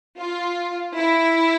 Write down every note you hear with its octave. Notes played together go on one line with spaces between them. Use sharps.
F4
E4